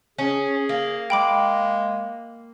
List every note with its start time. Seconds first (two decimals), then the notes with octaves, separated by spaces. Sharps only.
0.19 C#4 G#4
0.69 A#3
1.10 G#3 G5 B5 D6